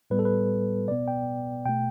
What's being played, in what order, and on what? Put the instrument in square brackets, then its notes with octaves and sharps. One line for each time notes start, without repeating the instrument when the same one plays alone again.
[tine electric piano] A2 G3 B3 B4
A4
B4
B2 B3 D5
G5
B2 A3 G5